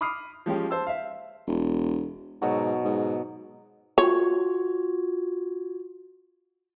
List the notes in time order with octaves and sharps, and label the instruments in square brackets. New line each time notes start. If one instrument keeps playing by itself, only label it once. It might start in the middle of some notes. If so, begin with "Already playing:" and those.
[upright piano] B5 D6 D#6 F6 C7
F3 G#3 C#4 G4
C5 A5 E6
E5 F5
[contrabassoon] E1
[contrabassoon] G#2 [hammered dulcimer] B2 F#3
[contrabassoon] G#2
[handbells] F4 F#4 G#6 [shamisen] C#5